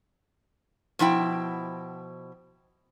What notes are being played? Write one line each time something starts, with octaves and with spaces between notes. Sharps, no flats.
B2 F3 E4 G5